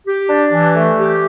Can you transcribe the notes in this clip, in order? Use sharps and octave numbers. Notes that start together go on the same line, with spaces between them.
G4
D4
E3
A3
G4